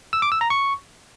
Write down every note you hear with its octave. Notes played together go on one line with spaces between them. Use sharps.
E6
D6
E6
A#5
C#6